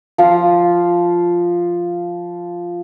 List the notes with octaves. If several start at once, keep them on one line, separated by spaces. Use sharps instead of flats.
F3 F5